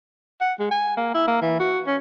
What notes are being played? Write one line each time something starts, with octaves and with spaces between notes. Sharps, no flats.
F#5
G#3
G#5
A#3
E4
A#3
E3
F#4
C#4